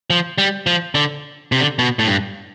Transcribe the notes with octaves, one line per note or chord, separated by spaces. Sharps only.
F3
G3
F3
D3
C3
D3
B2
A2
G2